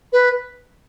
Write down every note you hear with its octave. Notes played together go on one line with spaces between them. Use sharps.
B4